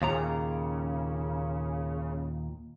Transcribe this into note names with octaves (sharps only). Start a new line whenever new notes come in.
D#2 A#2 C#3 A#5